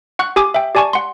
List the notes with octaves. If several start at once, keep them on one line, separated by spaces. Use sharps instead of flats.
F#5 C#6 F#6
G4 G#5 D6 D#6
E5 G5
G4 D5 G#5 A5 C#6
F#5 C6